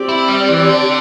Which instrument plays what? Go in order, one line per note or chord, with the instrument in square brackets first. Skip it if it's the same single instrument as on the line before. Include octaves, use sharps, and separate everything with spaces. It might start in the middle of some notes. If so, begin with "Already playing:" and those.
Already playing: [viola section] C4 G4 D5
[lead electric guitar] E4
G3
E3
D3